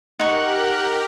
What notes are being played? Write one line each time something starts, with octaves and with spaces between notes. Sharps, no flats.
D#4 G4 A#4 F#5 C#6